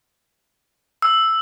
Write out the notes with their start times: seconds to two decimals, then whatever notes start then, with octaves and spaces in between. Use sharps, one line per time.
1.02 E6